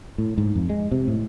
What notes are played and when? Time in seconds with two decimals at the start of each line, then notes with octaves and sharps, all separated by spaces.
0.18 A2
0.38 G#2
0.55 F2
0.69 G#3
0.92 C3
1.08 A2